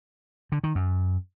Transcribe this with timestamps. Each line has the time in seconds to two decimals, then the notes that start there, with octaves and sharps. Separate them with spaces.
0.52 D3
0.64 D#3
0.75 F#2